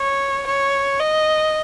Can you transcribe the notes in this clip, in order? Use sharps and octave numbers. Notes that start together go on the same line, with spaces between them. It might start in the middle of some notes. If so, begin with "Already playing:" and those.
Already playing: C#5
C#5
D#5